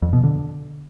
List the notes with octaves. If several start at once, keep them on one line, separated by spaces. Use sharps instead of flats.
F2
B2
D3